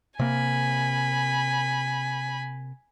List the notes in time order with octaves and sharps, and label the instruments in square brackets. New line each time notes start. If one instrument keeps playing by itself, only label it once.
[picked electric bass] C3 A#3 [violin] G#5 B5